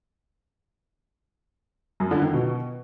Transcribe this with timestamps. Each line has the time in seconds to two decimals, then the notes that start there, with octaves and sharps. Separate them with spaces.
2.00 F#2
2.11 D3
2.22 D#3
2.33 B2